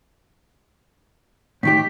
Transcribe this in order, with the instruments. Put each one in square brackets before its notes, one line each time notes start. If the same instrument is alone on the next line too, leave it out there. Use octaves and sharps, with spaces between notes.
[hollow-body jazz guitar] A2 D#3 G4 [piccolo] B6